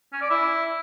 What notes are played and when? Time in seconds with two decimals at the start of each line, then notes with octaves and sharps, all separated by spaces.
0.13 C#4
0.21 D5
0.30 E4